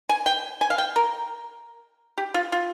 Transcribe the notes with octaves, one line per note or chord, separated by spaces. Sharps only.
G#5
G5
G#5
F5
G5
A#4
G4
F4
F4